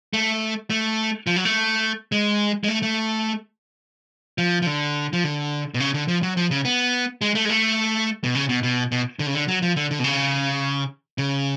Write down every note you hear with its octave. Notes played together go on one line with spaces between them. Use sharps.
A3
A3
F3
F#3
A3
G#3
G#3
A3
A3
F3
F3
D3
F3
D3
B2
C#3
D3
F3
F#3
F3
C#3
B3
G#3
A3
G#3
A3
B2
C#3
B2
B2
B2
D3
C#3
D3
F#3
F3
D3
D3
B2
C#3
C#3